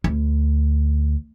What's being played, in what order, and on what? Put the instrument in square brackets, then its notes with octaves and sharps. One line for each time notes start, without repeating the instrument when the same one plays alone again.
[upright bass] D2